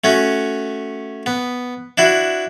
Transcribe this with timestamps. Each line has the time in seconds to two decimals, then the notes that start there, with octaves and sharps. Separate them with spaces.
0.04 A3 C#4 F#4
1.26 B3
1.98 D4 E4 F#4